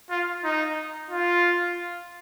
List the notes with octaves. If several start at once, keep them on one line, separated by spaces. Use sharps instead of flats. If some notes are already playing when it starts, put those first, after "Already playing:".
F4
D#4
F4